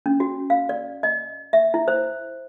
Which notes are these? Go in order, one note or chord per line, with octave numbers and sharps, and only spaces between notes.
C#4
F#4
F5
D5
D#5
E5
E4
C5